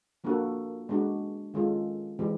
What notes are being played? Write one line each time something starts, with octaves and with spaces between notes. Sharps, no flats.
F3 A#3 D4 F#4 A4
G#3 B3 D4 F#4
D#3 G#3 C#4 F4 A4
E3 G#3 C4 E4 G4